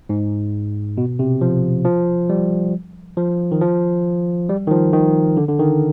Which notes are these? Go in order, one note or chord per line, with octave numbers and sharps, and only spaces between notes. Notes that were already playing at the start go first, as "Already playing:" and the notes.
G#2
B2
C3
F3
F3
G3
F3
D#3
F3
G3
D#3
F3
D#3
D3
D3
D#3